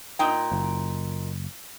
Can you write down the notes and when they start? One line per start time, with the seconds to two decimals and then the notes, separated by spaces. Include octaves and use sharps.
0.19 A#2 D#4 G5
0.52 F#1